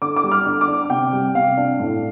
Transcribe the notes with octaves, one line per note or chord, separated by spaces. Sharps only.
D3 D6
D6
G3
F6
D3 D6
D6
D4
C3 G5
G3
C3 F5
D4
A2